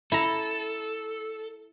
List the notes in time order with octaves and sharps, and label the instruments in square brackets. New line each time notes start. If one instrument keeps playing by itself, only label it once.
[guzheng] E4 A#5 [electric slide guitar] A4